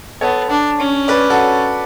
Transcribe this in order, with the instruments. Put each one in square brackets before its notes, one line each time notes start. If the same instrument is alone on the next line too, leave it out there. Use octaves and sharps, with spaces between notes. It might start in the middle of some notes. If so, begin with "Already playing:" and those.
[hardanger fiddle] B3 [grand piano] A4 C#5
[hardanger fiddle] D4
C#4
[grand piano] B4 D5
F#4 A4